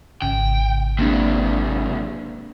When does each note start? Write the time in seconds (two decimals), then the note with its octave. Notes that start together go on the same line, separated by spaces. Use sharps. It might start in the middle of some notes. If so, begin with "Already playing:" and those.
0.22 G#1 C#3 G5
0.99 G#2 C3 A#3 C4 D4